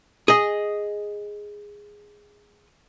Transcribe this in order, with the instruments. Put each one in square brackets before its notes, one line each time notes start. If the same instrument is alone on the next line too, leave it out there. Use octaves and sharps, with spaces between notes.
[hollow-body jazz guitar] G#4 D#5